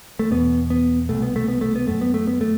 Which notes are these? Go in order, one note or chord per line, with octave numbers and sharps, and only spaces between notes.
A3
E2 B2 B3
B3
C2 B2 A3
B3
A3
B3
A3
B3
F#2 A3
B3
A3
B3
A3